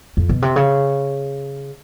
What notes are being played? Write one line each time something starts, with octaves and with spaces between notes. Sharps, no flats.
F2
B2
C3
C#3